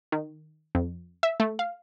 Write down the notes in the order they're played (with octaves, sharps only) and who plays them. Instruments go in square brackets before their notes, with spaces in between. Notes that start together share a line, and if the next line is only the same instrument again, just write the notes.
[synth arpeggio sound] D#3
F2
E5
A3
F5